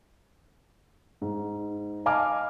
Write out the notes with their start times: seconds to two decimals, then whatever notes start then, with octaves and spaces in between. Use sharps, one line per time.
1.21 G#2
2.06 D#5 F5 G#5 A5 D6 F6